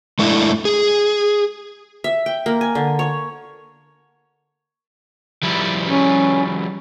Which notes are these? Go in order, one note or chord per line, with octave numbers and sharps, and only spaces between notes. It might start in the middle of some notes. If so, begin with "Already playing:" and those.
G#3 A3 D4 E4
G#4
E5
G5
A#3
G#5
D3
C#5
F3 G3 E4
C#4